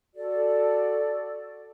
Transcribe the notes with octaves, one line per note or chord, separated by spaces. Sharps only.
F#4 A4 D5